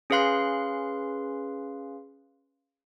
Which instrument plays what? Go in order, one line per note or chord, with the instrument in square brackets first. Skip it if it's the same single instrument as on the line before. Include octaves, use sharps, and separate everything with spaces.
[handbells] C#4 G#4 B4 F5 C6 F#6